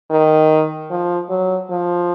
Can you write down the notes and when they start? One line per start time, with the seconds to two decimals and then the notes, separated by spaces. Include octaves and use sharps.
0.11 D#3
0.91 F3
1.29 F#3
1.70 F3